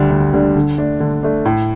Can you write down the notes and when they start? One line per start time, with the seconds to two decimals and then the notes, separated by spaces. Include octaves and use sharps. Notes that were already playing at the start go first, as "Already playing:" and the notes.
Already playing: D2 D3 G3 D4
0.11 D2
0.33 D3 G3 D4
0.56 D3
0.78 A3 D4
1.00 D3
1.23 A3 D4
1.45 A2